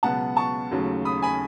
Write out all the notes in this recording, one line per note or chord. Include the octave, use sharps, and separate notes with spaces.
C#2 B2 F#3 B3 F#5 A5
A5 C#6
D#2 C#3 F#3 A3
B5 D#6
G#5 B5